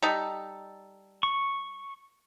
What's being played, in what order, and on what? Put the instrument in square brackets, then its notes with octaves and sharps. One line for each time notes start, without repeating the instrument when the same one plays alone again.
[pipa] G3 D#4 A4
[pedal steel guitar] C#6